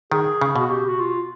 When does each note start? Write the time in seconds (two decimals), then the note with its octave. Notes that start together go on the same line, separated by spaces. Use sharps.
0.12 D#3 G#4
0.41 C#3
0.56 B2 F#4
0.70 G4
0.89 F#4
1.00 F4